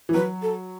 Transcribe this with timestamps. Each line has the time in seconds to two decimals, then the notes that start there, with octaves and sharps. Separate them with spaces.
0.09 E3
0.14 F#3 B4
0.42 A4